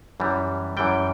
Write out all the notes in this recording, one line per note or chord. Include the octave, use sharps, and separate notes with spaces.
F#2 E3 G3
F#2 E3 G3 G5